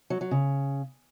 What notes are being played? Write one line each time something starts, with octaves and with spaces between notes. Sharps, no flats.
F#3
F#3
C#3